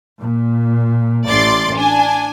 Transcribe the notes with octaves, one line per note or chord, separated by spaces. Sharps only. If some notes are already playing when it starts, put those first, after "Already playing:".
A#2
A1 D5 C6 D6 A6
D4 G#5